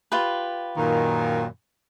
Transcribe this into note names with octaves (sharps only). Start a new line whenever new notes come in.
F4 G4 B4
F#2 A#2 D#3